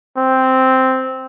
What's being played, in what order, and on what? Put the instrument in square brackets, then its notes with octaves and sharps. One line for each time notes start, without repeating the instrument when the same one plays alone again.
[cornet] C4